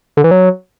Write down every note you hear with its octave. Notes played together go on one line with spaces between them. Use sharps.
D3
E3
F#3